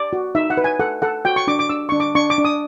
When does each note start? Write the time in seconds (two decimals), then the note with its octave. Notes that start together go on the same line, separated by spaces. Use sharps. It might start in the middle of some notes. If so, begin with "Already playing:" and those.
Already playing: D5
0.13 F#4
0.35 D#4 E5
0.50 F#5
0.57 B4
0.64 G#5
0.80 A4 F#5
1.02 A4 F#5
1.25 F#4 G5
1.36 C#6
1.47 D4 D6
1.59 D6
1.69 D4 E6
1.89 D4 C#6
2.00 D6
2.15 D4 C#6
2.30 D6
2.38 D4
2.45 D#6